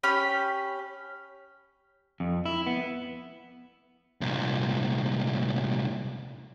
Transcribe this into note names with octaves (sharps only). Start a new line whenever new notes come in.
C#4 G4 B5
F2
E4
B3
C2 A#2